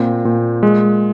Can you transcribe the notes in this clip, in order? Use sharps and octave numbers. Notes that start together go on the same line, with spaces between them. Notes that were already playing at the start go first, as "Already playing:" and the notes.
Already playing: A#2 C4
A#2
G#3